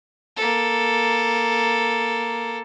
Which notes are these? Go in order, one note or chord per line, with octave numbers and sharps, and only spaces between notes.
A#3 A4